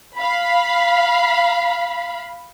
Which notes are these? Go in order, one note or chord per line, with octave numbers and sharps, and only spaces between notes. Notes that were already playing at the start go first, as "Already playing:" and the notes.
F5 B5